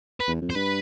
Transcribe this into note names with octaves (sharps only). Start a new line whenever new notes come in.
B4
E2
F2
C5
G2 B4